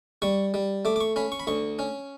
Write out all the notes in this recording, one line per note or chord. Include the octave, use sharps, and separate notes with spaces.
G3 C#6
G3
A3 D6
D6
C#6
C#4 B5
C#6
B5
D2 C#6
C#4